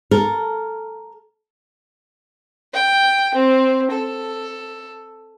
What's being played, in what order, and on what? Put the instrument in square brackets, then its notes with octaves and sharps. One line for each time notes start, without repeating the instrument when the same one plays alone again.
[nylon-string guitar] A4 A#4
[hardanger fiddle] G5
C4
A4